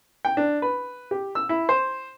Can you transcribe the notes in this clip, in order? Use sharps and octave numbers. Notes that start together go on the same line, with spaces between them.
G5
D4
B4
G4
E6
E4
C5